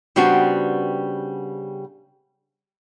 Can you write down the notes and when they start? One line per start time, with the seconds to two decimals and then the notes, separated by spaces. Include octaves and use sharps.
0.16 C#3 G3 B3 C4 D4 F#4